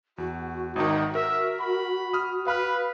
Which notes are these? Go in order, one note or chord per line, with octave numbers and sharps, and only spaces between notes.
E2 F#4
G#1 D#3 D#4 F#4
A#4 E5
B5
D#6 F6
B4 F5 B5 F6